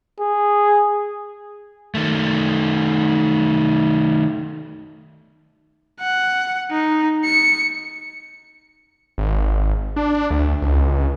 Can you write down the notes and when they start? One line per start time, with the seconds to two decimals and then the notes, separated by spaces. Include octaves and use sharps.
0.19 G#4
1.95 D#3 A3
6.00 F#5
6.71 D#4
7.25 C#7
9.18 G#1
9.96 D4
10.31 D2
10.62 C#2